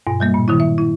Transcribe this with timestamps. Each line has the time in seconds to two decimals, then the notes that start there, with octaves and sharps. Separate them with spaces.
0.07 G2 B2
0.20 F#3 G3 A#3
0.34 A#2
0.48 D#3 F#3 E4
0.60 E5
0.78 E4